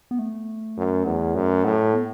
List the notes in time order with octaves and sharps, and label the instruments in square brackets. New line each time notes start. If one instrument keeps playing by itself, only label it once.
[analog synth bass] B3
A3
[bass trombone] F#2
E2
F#2
A2
[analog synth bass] B3